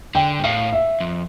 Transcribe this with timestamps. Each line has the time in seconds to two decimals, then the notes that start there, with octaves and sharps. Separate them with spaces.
0.15 D3 G5
0.39 G2
0.44 A2 F5
0.73 E5
1.00 F2